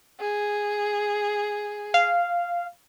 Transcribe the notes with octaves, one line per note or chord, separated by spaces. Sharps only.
G#4
F5